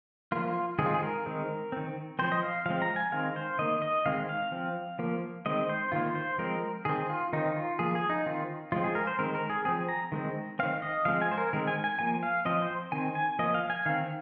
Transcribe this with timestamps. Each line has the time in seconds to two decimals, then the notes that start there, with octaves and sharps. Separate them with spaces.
0.32 F3 A#3 F4
0.79 D#3 G#3 C4 G#4
0.86 F4
0.94 G#4
1.03 A#4
1.26 D#3 G#3 C4
1.72 D#3 C4
2.19 F3 C4 C5
2.32 D#5
2.43 F5
2.66 F3 G#3 C4 F5
2.82 A#5
2.96 G#5
3.12 D#3 G#3 C4 F5
3.36 C5
3.59 D#3 A#3 D#5
3.82 D#5
4.06 D#3 G#3 C4 F5
4.29 F5
4.52 F3 C4
4.99 F3 A#3
5.46 D#3 G#3 C4 D#5
5.69 C5
5.92 D#3 A#3 F4
6.15 C5
6.38 F3 G#3 C4 A#4
6.85 D#3 C4 G#4
7.10 F4
7.33 D#3 C4 D#4
7.56 F4
7.79 F3 A#3 G#4
7.95 G#4
8.10 D#4
8.26 D#3 C4 F4
8.72 F3 G#3 C4 F4
8.84 G#4
8.95 A#4
9.07 C5
9.19 D#3 G#3 C4 A#4
9.35 A#4
9.50 G#4
9.65 F3 C4 G#4
9.89 A#5
10.12 D#3 G#3 C4
10.59 D#3 C4 F5
10.82 D#5
11.05 F3 G#3 C4 F5
11.22 G#5
11.31 C5
11.38 A#4
11.53 D#3 G#3 C4 A#4
11.67 G#5
11.84 G#5
11.99 F3 A#3 G#5
12.23 F5
12.45 F3 C4 D#5
12.62 C5
12.92 D#3 C4 G#5
13.15 G#5
13.39 F3 A#3 D#5
13.54 F5
13.70 G#5
13.86 D#3 C4 F5